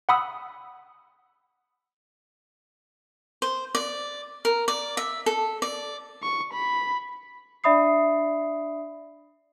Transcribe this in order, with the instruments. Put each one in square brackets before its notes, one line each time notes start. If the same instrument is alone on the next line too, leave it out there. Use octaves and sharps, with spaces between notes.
[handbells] F#5 B5 D#6 E6
[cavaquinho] C5
D5
A#4
D5
E5
A4
D5
[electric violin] C#6
B5
[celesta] D4 D5 E5 B5 D#6 C7